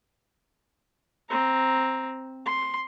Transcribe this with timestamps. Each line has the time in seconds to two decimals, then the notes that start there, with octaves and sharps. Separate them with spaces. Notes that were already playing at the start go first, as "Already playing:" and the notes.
1.30 C4 A#5
2.46 C6